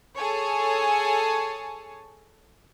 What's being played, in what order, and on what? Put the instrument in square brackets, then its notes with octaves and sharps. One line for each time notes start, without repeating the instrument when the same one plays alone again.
[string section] G#4 A4 C#5 G#5 A5